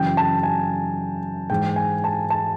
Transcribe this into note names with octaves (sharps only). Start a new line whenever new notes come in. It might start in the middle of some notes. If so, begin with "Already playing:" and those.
Already playing: F#2 C#3 E3 G5
A5
G#5
G#2 E3 G5
G#5
A5
A5